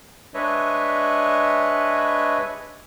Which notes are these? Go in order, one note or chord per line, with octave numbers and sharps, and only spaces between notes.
G#3 D4 B4 C#5 D#5 E5